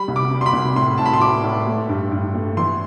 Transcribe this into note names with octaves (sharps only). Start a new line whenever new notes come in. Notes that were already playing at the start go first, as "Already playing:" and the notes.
Already playing: G3 B5
C2
D6
C3
C6
B5
C2
A2 C6
A2 A5
B5
C6
A2 D6
A2
A3
G2
G2
A3
E3 C6